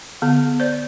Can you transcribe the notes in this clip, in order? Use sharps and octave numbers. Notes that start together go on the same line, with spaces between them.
D3 B3
C5 D5